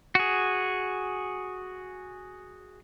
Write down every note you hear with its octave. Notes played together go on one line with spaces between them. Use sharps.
F#4 G#4